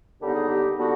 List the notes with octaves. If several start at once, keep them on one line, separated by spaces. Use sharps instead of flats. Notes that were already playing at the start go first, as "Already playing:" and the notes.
D#2 D3 G3 B3 D#4 G4
G#4
G4
D3 G3 B3 D#4 F#4